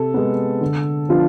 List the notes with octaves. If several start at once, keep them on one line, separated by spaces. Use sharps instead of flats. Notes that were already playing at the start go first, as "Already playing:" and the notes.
Already playing: C3 A4
G#3 B3
D3
F3 B3 D4 F4